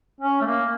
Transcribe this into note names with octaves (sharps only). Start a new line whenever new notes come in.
C#4
A3
A#3